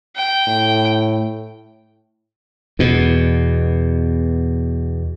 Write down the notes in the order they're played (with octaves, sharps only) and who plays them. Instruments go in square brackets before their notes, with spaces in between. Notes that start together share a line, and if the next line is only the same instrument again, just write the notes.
[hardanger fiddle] G5
[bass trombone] A2
[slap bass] E2 B2